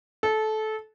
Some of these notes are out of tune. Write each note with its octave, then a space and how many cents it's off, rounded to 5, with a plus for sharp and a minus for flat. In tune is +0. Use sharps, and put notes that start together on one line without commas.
A4 -20